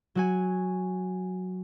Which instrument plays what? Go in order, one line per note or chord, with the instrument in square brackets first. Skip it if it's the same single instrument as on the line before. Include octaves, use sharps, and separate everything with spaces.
[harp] F#3 F#4 G#5